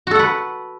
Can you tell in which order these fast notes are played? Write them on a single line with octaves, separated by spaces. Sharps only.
F#4 A4 F#5 B4